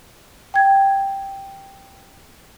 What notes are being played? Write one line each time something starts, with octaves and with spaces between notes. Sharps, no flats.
G5 G#6